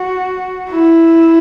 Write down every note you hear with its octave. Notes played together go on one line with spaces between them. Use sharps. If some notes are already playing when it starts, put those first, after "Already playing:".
Already playing: F#4
E4